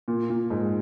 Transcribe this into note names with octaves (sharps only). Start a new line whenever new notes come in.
A#2
A#2
G#2